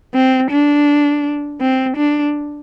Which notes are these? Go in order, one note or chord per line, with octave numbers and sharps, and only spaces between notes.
C4
D4
C4
D4